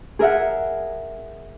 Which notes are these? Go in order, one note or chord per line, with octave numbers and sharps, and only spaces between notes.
G#4 A#4 E5 F#5